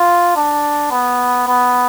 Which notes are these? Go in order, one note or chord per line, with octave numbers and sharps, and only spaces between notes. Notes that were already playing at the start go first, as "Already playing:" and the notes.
Already playing: F4
D4
B3
B3